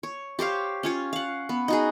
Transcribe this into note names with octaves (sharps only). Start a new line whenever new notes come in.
C#5
G4 C5 C#5 F5
C#4 F4 C#5
F5 F#5
B3
D#4 F#4 G#4